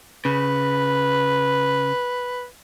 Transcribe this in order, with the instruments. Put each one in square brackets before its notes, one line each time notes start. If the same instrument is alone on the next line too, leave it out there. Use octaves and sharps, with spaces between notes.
[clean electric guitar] C#3 [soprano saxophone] B4